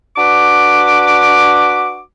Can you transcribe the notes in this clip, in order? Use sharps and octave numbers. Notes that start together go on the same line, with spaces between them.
D4 F#4 B4 D6